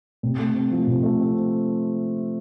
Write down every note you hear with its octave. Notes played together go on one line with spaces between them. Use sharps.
C3
A3
C4
F3
C3
A3
C4